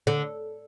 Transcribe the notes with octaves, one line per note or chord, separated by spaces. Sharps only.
D3